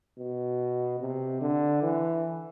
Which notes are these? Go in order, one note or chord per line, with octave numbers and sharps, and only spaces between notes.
B2
C3
D3
E3